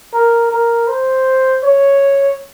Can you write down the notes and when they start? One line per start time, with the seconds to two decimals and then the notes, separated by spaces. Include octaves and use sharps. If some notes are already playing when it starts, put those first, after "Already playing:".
0.13 A#4
0.51 A#4
0.88 C5
1.64 C#5